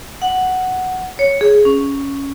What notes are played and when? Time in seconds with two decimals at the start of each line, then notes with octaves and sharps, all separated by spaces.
0.22 F#5
1.19 C#5
1.41 G#4
1.65 C#4